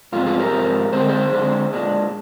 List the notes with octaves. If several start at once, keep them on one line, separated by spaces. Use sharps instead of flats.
G#2 F3 G#3 C4 F4
F4 G#4
G4 A#4
G#2 F3 G#3 C4
D3 G#3 C4 C5
A#4
G#4 C5
D3 G#3 C4
A#2 G#3 D4